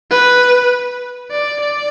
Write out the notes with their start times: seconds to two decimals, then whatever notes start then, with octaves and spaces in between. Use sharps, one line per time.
0.11 B4
1.31 D5
1.60 D5